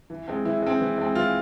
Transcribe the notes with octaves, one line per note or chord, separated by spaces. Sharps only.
E3
G#3 C4
E3 E4
G#3 C4
E3
G#3 C4
E3 F4